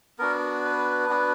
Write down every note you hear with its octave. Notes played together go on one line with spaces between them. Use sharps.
B3 D4 F#4 A#4
B4
B3 D4 F#4